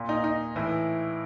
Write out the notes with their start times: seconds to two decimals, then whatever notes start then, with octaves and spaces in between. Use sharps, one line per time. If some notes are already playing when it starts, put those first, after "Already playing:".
Already playing: A#2
0.09 D#4
0.24 D#4
0.56 A2 E3